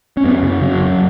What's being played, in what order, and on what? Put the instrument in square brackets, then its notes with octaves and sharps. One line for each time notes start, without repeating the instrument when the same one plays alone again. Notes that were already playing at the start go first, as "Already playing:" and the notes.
[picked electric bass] C#4
F#2 B3
C#3
C#3 F#3
F#2